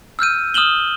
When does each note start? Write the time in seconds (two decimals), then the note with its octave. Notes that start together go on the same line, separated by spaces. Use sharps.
0.19 E6 F6 G6 D#7
0.54 D#6 F6 E7 F#7 G7